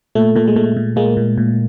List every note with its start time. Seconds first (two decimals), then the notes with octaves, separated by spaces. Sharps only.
0.15 A#2 A3
0.36 A#2 A3
0.47 G#3
0.56 A#2 A3
0.77 A#2
0.96 A#2 G#3 A#3
1.17 A#2
1.38 A#2